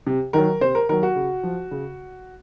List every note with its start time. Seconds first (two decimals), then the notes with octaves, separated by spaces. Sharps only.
0.07 C3
0.33 D#3 F#3 A#4
0.61 C3 C5
0.75 A#4
0.89 D#3 F#3 A#4
1.03 F#4
1.16 C#3
1.43 F3
1.71 C#3